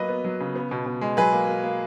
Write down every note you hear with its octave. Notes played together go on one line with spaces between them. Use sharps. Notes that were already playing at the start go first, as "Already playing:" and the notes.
Already playing: F#3 A#3 B4 D#5
B3
F#3
C#3
B3
B2
B2
G#3
F#3 G#4 B4
A#3
A#3
A#3